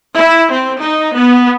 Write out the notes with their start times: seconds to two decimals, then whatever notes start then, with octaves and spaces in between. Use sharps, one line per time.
0.15 E4
0.51 C4
0.82 D#4
1.18 B3